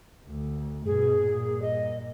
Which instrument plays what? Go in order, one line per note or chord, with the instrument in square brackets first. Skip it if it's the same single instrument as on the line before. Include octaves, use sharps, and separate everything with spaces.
[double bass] D2
[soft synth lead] G2 [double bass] B2 [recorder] G#4
[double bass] A#2
[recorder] D#5